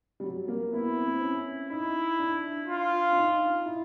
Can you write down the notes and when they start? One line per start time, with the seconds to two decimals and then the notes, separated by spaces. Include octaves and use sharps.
0.20 G3
0.24 F#3
0.48 A#3
0.72 B3 E4
0.97 C4
1.22 C#4
1.70 D#4 E4
2.19 D4
2.68 F4
3.12 D4
3.17 D#4
3.66 E4